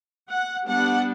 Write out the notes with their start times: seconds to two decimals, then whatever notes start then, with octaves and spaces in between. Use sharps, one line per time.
0.28 F#5
0.67 G3 B3 D4 F#5